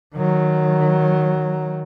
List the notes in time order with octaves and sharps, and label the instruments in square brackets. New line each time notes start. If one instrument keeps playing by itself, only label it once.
[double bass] D#3 F#3